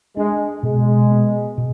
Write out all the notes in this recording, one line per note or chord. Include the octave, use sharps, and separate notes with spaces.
G#3 D4
B2 G#3
B3
B2